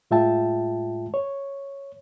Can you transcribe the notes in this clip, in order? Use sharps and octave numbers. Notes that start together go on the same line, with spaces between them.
A2 G#3 F4 E5 G5 A5
C#5